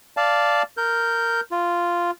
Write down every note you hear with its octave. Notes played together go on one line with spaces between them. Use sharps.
D5 F5 A5
A#4 G6
F4